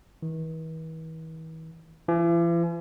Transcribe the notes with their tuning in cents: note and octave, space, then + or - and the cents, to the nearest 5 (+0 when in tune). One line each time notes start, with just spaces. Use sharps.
E3 -45
E3 +45